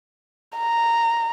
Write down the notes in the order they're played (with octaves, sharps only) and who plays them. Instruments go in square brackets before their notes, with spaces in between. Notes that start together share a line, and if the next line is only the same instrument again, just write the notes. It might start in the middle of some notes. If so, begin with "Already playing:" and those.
[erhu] A#5